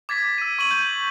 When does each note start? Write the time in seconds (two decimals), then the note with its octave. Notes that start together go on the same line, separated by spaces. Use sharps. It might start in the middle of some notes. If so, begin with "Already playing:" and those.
0.09 D6 G#6 A6 B6
0.38 E6 D#7
0.59 C#6 D#7 F#7
0.71 G6